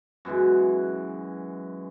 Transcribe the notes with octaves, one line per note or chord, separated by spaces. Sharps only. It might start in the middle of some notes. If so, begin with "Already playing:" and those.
F#2 B2 E3 G#3